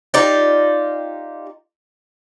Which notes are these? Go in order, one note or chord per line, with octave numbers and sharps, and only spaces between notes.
D#4 F4 G4 D5